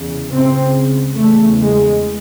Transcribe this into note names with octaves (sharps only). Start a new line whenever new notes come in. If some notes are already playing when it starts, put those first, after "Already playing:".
Already playing: E2 C#3
C#2 C#3 C4
E2 C#3 A3
G#3